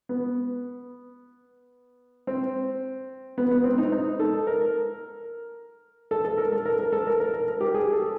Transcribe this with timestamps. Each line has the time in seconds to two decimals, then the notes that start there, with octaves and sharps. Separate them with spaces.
0.09 B3
2.27 C4
3.38 B3
3.51 B3
3.64 C4
3.78 D#4
3.92 D#4
4.20 A4
4.47 A#4
6.11 A4
6.25 A4
6.37 A#4
6.52 A4
6.65 A#4
6.79 A#4
6.93 A4
7.07 A#4
7.20 A#4
7.34 A#4
7.48 A#4
7.61 G4
7.74 G#4
7.93 A4